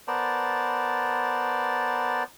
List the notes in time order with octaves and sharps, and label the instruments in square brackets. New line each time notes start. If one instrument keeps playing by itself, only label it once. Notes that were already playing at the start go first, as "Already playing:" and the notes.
[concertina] B3 A#4 C5 D5 A5